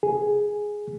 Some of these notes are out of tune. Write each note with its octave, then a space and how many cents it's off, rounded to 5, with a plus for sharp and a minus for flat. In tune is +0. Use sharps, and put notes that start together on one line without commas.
G#4 +0